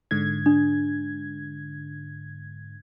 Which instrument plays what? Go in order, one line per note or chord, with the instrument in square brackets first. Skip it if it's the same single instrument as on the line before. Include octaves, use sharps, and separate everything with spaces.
[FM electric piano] G#2 D3 G#6
[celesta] D4